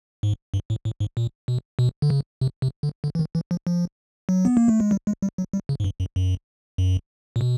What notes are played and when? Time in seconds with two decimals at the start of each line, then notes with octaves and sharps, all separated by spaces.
0.23 G#2
0.54 G2
0.70 A2
0.85 A2
1.00 G#2
1.17 A#2
1.48 B2
1.79 B2
2.02 D3
2.10 C#3
2.41 C3
2.62 C3
2.83 D3
3.04 D3
3.15 E3
3.19 D#3
3.35 E3
3.51 F3
3.67 F3
4.29 F#3
4.45 B3
4.57 A#3
4.68 A3
4.80 G#3
4.91 G3
5.07 G#3
5.22 G3
5.38 F#3
5.53 G3
5.69 C#3
5.80 G#2
5.84 G2
6.00 F#2
6.16 F#2
6.78 F#2
7.36 A#2
7.41 B2